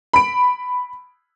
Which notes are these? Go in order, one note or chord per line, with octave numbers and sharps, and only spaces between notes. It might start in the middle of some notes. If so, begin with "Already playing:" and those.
B5 D7